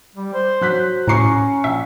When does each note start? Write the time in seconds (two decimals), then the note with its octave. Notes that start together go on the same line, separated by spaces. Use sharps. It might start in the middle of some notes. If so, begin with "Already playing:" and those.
0.15 G3
0.34 C5
0.61 F#3 F#6 B6
1.08 A2 C#4 A#5 C#6 C7
1.64 A#1 E5